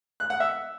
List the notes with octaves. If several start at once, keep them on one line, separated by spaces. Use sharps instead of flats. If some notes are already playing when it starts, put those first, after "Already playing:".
F#6
F#5
E5